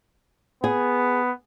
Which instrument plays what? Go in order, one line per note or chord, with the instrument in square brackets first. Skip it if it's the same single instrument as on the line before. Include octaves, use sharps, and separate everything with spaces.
[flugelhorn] B3 [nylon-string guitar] G#4